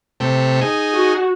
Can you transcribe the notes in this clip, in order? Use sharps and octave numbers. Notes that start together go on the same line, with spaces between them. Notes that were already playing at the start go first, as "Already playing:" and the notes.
C3 A3 G4
D#4 G#4
F#4